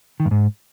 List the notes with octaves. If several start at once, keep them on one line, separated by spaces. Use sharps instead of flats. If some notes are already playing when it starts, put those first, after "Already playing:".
D#3
G2
G#2